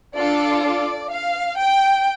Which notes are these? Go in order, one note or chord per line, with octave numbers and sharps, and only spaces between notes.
D4 F4 A4 D5
D5
F5
G5